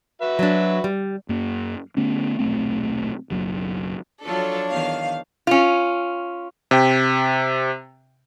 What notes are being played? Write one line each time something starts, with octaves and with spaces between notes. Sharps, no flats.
F#4 B4 E5
F#3 D4
G3
F#2 A#3
D3 A3 B3 C#4
D#1 B1 A3 C4
F#1 B1 F#3
F3 F#3 D4 F4 A4 C#5
E2 D#3 F5
C#4 F4
C3 G5